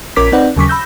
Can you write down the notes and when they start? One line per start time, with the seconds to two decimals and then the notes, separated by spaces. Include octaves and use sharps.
0.16 A#1 C#4 A#4 D6 B6
0.32 C4 D#4 B4 D5 F#5
0.57 D#2 C#3 F#3 C#6 D6 B6
0.68 B5 E6 G6 A#6